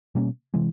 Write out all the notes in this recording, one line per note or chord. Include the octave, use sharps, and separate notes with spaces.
B2 G3 A#3 C#4
C3 E3 G#3